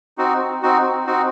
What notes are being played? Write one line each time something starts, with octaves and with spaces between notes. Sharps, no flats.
C4 D#4 F#4
C4 D#4 F#4
C4 D#4 F#4